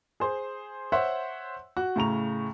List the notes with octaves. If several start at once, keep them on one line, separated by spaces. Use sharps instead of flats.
G#4 C5
C5 C#5 E5 F#5
F#4
A2 C#3 A#5 F7